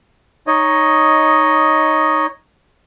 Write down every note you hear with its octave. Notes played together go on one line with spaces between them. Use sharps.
D#4 C#5 D#5